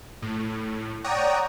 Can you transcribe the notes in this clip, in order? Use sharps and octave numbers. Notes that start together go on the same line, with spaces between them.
A2
C#5 D5 F#5 G5 A#5 D#6